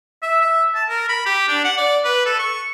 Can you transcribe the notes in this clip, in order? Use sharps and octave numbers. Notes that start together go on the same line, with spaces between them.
E5
E5
A5
A#4
B5
G4
D4
F#5
D5
B4
A4
C#6